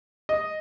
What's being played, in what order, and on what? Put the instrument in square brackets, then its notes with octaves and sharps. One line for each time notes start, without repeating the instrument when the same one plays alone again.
[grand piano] D#5